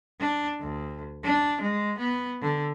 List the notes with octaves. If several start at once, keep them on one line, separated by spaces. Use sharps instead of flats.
D4
D2
D4
G#3
B3
D3